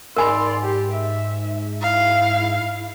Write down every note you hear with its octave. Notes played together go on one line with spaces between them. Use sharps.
G#2 A#4 D5 G#5 B5 C6
G4
E5
E4 F5